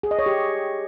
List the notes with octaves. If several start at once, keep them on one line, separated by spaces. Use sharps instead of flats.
G#4
D#5
C#5
G4